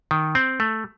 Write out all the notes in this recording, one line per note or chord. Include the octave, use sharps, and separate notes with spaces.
D#3
C4
A3